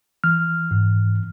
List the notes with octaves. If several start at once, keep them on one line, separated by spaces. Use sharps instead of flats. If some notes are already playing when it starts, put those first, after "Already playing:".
E3 F6
G#2